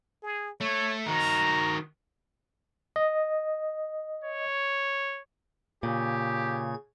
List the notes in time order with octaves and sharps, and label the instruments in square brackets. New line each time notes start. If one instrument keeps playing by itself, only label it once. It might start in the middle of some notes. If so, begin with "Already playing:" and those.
[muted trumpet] G#4
[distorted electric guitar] A3 [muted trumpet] C#5
[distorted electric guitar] D#3 F#4 [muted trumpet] A#5
[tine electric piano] D#5
[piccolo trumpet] C#5
[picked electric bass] A#2 [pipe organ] C#3 G#6 [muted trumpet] G4